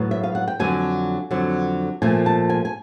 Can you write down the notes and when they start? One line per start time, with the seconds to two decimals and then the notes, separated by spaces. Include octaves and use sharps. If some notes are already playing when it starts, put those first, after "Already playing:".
Already playing: A2 F#3 B3
0.11 E5
0.24 F5
0.35 F#5
0.48 G5
0.60 F2 D3 F#3 G#5
1.31 F2 D3 F#3
2.02 A#2 F3 A3 G#5
2.26 A5
2.50 G#5
2.65 G#5